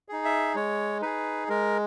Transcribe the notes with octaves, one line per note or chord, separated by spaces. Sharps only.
D#4 G#4
E5
G#3 C#5
D#4 G#4 B4
G#3 A#4